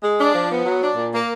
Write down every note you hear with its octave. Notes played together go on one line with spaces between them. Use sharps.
G#3
D4
F3
B3
F#3
D4
A#2
A#3